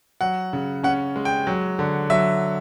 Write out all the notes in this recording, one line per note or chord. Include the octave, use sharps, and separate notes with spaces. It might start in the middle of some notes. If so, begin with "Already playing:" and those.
F#3 F#5
C#3
C#4 F#5
G#3
G5
F#3
D3
F#3 E5